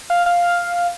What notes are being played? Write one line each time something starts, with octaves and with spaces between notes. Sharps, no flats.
F5
F5